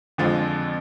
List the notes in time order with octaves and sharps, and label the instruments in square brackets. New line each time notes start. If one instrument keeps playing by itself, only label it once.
[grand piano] F2 D3 F3 G#3